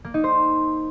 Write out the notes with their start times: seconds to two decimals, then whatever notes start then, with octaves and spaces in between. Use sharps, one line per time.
0.05 A#3
0.14 D#4
0.24 C5